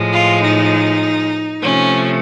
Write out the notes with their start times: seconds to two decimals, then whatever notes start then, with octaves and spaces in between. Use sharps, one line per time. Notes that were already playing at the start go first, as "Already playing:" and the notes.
Already playing: A2 F3 G#3
0.11 F4
0.41 D#4
1.61 C3 F3 A3 C#4